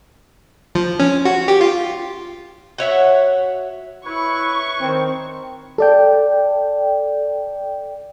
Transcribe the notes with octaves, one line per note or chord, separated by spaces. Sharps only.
F3
C#4
F#4
G4
F4
F#4 C#5 E5 F#5
E4 B4 C#5 C#6
D#3 C4
A4 D5 G5